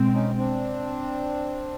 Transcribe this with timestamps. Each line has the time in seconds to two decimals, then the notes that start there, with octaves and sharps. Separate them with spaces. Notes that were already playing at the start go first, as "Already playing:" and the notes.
Already playing: B2 G#3 C4
0.14 C#4 D#4
0.37 C4 D4